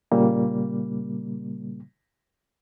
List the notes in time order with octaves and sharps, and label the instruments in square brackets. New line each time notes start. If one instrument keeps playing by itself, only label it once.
[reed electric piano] A#2 C#3 G3 A#3